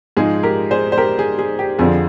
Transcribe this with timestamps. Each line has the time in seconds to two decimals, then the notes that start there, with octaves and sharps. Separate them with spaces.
0.17 G#2 F3 G#3 G#4
0.43 G4 A#4
0.71 G#4 C5
0.92 C5
0.98 G4 A#4
1.19 G#4
1.39 G#4
1.59 G4
1.79 F2 D3 F3 C4 G#4